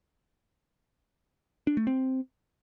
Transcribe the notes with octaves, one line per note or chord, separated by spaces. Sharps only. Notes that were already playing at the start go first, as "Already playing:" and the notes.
D4
A3
C4